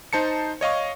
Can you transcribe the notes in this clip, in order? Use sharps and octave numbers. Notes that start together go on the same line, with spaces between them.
D#4 C5 A5 C#7
C#5 D#5 F5 C#6